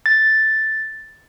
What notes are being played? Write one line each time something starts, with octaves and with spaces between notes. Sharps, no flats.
A6